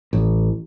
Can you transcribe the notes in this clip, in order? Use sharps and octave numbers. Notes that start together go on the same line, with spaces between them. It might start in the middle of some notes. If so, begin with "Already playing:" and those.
A1